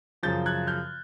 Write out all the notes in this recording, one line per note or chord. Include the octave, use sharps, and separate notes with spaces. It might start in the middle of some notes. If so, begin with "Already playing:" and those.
F#2 C#3 F3 G6 A6
F#6 G#6
F6 G6